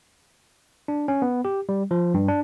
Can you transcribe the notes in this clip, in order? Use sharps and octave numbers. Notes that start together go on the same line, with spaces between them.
D4
C#4
B3
G4
G3
F3
G2
D4